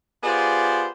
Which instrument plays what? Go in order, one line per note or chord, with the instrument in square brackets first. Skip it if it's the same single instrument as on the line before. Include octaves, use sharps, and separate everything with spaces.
[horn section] B3 F4 G4 G#4 C5 D5